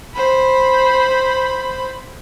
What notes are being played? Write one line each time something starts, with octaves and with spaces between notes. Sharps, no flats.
C5 B5